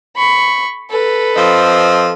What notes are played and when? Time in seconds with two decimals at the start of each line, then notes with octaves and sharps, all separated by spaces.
0.17 B5 C#6
0.90 A4 B4
1.35 F3 C4 D#5